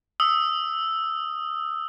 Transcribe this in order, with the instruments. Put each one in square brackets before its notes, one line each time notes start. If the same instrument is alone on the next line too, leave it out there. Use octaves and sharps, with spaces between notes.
[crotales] D#6 E6